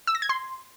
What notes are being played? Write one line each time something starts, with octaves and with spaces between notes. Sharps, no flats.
E6
A#6
G#6
C6